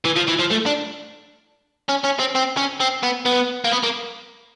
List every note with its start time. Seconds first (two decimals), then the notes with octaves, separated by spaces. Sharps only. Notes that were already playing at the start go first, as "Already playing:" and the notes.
0.05 E3
0.17 F3
0.28 E3
0.40 F3
0.51 A3
0.66 D4
1.89 C#4
2.04 C#4
2.19 C4
2.35 C4
2.57 C#4
2.80 C4
3.03 B3
3.26 B3
3.64 A#3
3.72 B3
3.83 A#3